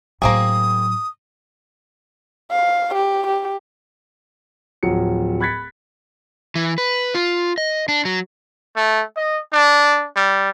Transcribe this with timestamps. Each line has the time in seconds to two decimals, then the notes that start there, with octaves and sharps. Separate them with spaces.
0.22 A2 F#3 A#3 C4 G#4 D#6
2.51 F5
2.94 G4
3.27 G4
4.83 D1 F3 F#3 C#7
5.40 B5 F#6 G#6 A6 B6 C#7
6.55 E3
6.78 B4
7.15 F4
7.58 D#5
7.88 D4
8.05 F#3
8.76 A3
9.16 D#5
9.52 D4
10.16 G3